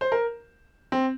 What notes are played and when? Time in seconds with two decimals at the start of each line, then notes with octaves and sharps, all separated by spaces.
0.01 C5
0.12 A#4
0.92 C4